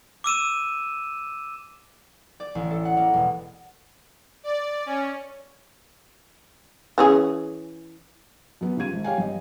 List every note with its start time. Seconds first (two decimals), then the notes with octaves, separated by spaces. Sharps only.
0.24 D6 E6 D#7 E7
2.40 D5
2.55 A1
2.70 A4
2.85 F#5
2.97 A#3
3.14 E1
4.44 D5
4.86 C#4
6.98 E3 C#4 G#4
8.61 F#2 B3
8.77 C#3 G3 F4 G#6 D#7
8.93 G#1
9.04 G4 C#5 F5 G5 G#5
9.18 G2 D#5